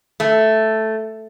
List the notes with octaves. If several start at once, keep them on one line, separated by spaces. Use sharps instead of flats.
A3